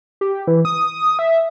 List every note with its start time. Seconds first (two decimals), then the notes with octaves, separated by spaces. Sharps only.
0.21 G4
0.47 E3
0.65 D#6
1.19 E5